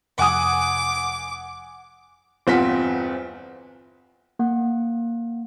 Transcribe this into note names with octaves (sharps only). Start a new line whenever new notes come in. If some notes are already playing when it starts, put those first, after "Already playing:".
F1 F#5 G#5 D6 D#6
G1 E2 C4 F4 F#5 B6
A#3 F#5